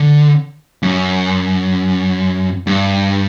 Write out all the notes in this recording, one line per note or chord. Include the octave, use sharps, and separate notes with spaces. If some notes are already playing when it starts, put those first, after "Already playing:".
Already playing: D3
F#2
G2